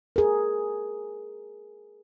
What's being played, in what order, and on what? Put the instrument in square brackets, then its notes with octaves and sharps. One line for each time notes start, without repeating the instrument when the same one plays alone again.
[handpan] G#4 A#4